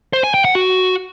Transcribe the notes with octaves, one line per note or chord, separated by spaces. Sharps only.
C5
G#5
G5
F#5
F#4